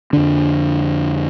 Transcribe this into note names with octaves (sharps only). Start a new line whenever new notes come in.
F2 D3 D4